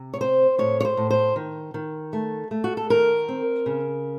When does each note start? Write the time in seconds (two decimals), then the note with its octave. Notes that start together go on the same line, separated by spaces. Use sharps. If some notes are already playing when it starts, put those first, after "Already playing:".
Already playing: C3
0.14 C#5
0.21 C4 C5
0.58 A2 C#5
0.80 C#5
0.85 C5
0.97 A2
1.10 C5
1.36 D#3
1.74 D#3
2.13 A3
2.51 A3
2.64 F#4
2.77 A4
2.90 D#3 A#4
3.28 C4
3.66 C#3